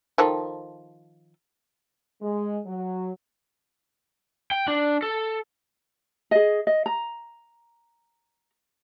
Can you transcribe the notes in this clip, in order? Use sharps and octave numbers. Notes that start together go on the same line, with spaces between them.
D#3 F3 A4
G#3
F#3
G5
D4
A4
G#4 D#5
D#5
A#5